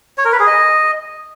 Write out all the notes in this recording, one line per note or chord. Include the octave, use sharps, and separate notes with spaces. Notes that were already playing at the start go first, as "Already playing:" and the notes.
C#5
A#4
B4
G#4
D#5